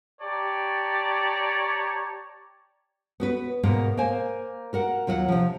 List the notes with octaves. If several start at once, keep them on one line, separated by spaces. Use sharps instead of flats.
G4 C#5 D5 A5 A#5
B3 F#4 B4
G#2 B2 A#3 B3 A#4
A#3 A#4 C5 G#5
F#4 A#4 F#5
D#2 F#3 F4 E5 F#5
C3 F3